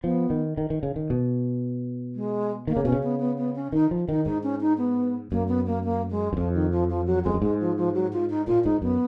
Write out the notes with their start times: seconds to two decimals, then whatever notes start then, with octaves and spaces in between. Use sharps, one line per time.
0.04 F3 B3
0.30 D#3
0.57 D#3
0.70 D#3
0.83 C#3
0.96 D#3
1.10 B2
2.15 G#3
2.67 D#3 A#3
2.77 C#3
2.85 B2 C#4
2.92 C#3
3.03 B3
3.20 B3
3.38 B3
3.56 C#4
3.72 D#3 D#4
3.91 F3
4.09 D#3 D#4
4.26 G#2 D#4
4.43 C#4
4.61 D#4
4.78 B3
5.31 F#2 A#3
5.48 B3
5.67 A#3
5.84 A#3
6.10 G#3
6.33 F#2
6.37 F2 F3
6.54 D#3
6.72 F3
6.89 F3
7.07 F#3
7.24 F2 G#3
7.34 F#2
7.42 G#2 G#3
7.60 F3
7.77 F3
7.95 F#3
8.13 F4
8.30 D#4
8.47 A#2 F4
8.64 G#2 D#4
8.82 F#2 B3